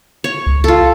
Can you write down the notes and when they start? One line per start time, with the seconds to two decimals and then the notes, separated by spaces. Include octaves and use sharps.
0.24 C#5
0.47 C#2
0.64 F4 A4